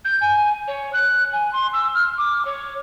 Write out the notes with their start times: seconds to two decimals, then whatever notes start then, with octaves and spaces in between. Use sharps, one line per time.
0.05 G6
0.21 G#5
0.68 C#5
0.93 F#6
1.33 G#5
1.53 C6
1.73 E6
1.95 F6
2.18 D6
2.45 C#5